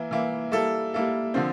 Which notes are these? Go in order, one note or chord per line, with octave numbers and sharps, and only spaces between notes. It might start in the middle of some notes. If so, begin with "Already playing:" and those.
Already playing: E3 A#3 E4
E3 A#3 E4
G3 A#3 E4 A4
G3 A#3 E4 A4
D3 F3 C4